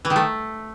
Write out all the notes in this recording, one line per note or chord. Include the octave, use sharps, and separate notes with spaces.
E3
D#3
A3